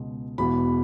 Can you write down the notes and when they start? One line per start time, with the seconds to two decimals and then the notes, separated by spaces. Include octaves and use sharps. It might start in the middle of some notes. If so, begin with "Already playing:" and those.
Already playing: C#2 B2 G#3
0.38 E1 E2 B2 B5